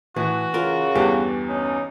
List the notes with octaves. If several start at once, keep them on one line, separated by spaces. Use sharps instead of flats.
A2 E3 F#4
C#3 F4 A#4
E2 G2 E3 G4 A4
C#4 D#4